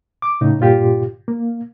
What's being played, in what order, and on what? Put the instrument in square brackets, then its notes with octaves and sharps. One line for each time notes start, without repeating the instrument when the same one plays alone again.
[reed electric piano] D6
A2 C#3 D#4
G2 A#2 F4 G4
A#3